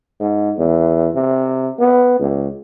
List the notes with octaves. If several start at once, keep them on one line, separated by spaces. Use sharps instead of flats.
G#2
E2
C3
B3
C#2